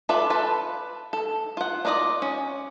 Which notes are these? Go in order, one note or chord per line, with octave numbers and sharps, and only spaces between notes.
F4 A4 B4 D5 E5
F4 A4 B4 A5
A4
F4 F#5
D4 D#4 F4 D5 D#5
C#4